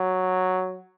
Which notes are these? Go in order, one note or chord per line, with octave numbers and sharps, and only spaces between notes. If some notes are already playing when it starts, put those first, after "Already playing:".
Already playing: F#3